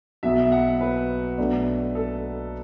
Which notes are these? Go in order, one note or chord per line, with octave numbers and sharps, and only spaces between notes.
B1 B2 F#3 E5
F#5
B4
B1 B2 A3 D4
A4